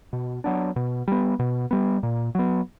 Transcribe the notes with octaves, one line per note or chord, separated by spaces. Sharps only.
B2
F#3 B3 D4
B2
G3 B3
B2
G3 B3
A#2
F#3 B3